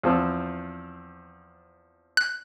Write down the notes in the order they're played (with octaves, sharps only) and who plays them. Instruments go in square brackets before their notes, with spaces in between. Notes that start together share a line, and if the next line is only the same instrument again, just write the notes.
[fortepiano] E2 F3 C4
[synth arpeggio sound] F#6